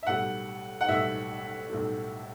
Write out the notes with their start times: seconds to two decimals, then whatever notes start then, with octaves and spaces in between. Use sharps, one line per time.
0.03 E5
0.07 B1 A2 G3 F#5
0.81 F#5
0.88 B1 A2 G3 E5
1.69 B1 A2 G3